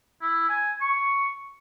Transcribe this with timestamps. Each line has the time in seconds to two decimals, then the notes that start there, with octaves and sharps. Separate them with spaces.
0.22 E4
0.49 G#5
0.81 C#6